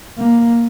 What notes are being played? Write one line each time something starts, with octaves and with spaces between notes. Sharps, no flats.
A#3